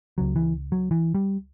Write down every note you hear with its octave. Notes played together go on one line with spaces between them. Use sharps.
C#2 C#3 F#3
E3
F#3
E3
G3